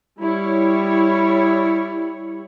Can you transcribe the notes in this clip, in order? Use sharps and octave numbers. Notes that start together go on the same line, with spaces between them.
G3 E4 C#5